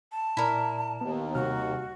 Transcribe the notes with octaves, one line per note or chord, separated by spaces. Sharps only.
A5
A#2 E4 A#4 D5
D#2 B3
C3 G3 F#4 F6